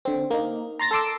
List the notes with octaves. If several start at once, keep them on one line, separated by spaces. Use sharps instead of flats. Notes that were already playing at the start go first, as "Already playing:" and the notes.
D3 C4
A#3 D#4
A#5 C6 A6 A#6
A4 A5 C6 D6 E6